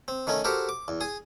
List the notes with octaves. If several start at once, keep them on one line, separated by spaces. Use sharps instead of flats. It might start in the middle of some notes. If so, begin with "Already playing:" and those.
C4
D#3 A3 C#4 D#4
F#4 G4 A4 A#4 C5
D6
E2
G#4 D#6